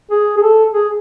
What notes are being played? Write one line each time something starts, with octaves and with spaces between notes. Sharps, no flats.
G#4
G#4
A4
G#4